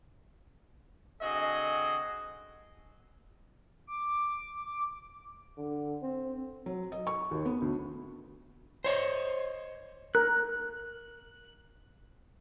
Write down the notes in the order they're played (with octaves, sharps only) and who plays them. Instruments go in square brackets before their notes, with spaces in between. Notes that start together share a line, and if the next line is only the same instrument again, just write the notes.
[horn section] D3 C4 F#4 G#4 D#5
[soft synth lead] D6
[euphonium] D3
C4
[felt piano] F#3
D#5
C#6
D#2
B3
D2
[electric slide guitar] C5 C#5 D#5
[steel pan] A#4 [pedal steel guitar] F#6